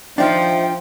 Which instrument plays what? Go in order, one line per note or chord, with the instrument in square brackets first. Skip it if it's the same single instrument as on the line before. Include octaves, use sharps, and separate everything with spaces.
[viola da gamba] F3 [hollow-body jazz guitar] D4 D#4 F4 [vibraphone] C5 E5 [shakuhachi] G5